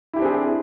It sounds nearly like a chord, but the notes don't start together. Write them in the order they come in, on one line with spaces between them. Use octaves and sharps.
E4 G4 D4 C4 G#4